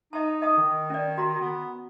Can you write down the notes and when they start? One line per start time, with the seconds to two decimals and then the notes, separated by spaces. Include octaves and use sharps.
0.13 D#4 D#5 A5
0.42 D#5 A5 D#6
0.57 D#3
0.90 C#4 D5
1.18 F#4 A#5
1.41 B3